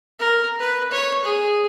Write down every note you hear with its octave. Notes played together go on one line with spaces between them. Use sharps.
A#4
B4
C#5
G#4